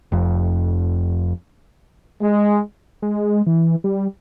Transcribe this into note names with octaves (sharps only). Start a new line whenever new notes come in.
F1 F2
G#3
G#3
E3
G3